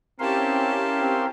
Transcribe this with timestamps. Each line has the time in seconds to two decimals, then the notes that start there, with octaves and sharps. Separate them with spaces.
0.20 C4 C#4 E4 G4 A#4 F5 A5 C6
1.01 C4